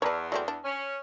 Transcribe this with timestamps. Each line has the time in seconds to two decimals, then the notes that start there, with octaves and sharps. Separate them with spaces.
0.02 E2 B4 C#5 D5 A5 A#5
0.32 F#3 A3 C4 D5
0.48 D4
0.64 C#4